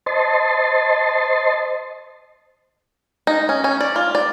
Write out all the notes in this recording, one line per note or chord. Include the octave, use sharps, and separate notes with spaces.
C5 D#5 A5 C6
D#4
C#4
C#4
D5
F4
D5